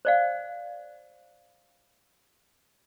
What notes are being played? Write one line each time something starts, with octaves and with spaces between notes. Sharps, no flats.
C5 D5 F5